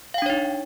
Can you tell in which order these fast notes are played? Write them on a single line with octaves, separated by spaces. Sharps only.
F5 G5 D4 C#5 D#4